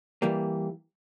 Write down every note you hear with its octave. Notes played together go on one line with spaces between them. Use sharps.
E3 G3 A#3